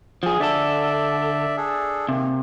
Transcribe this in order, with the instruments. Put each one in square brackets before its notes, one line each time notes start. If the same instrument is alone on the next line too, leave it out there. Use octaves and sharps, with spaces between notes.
[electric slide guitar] F3 G#4
[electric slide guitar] D3 A4 [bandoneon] D5 E5
[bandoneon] D4 G#4 A4
[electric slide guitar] C3 [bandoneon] D#3 A#3